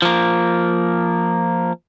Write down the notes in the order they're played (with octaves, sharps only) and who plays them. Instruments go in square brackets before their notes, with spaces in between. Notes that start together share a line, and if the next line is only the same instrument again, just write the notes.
[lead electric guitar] F3 A#3